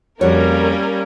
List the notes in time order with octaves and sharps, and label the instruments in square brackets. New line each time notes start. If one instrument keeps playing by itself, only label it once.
[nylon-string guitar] F2 F#4 C#5 [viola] G3 C#4 [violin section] A#3 A#4